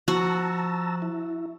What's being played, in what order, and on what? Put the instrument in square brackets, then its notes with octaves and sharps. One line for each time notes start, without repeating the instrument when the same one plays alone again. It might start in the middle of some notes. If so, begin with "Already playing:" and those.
[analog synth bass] F3 [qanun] F#4 [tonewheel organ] A5 A#5 E6
[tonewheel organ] E4